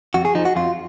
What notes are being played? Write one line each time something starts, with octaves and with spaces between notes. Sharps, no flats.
F2 F#4
G#4
F3 D#4
F#4
F2 F4